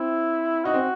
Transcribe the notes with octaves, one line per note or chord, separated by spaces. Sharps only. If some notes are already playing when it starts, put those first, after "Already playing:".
Already playing: C4 E4
D#4 F#4
C4